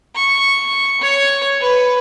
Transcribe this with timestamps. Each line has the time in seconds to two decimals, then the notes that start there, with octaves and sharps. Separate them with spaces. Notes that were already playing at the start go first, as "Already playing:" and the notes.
0.15 C#6
1.01 C#5
1.61 B4